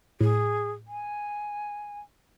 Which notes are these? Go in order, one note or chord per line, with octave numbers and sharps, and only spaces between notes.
A2 G#4
G#5